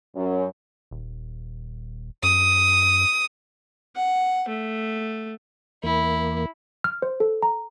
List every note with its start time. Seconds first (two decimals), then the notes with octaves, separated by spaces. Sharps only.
0.16 F#2
0.91 D#1
2.23 F#2 D#6
3.96 F#5
4.48 A3
5.83 E2 A#3 E4
6.84 F6
7.02 C5
7.20 A4
7.43 A#5